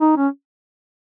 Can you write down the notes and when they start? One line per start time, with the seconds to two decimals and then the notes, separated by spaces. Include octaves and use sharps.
0.01 D#4
0.17 C#4